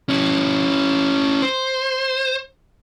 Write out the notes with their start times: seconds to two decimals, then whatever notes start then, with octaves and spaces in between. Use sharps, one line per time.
0.09 C#4 E4
1.42 C5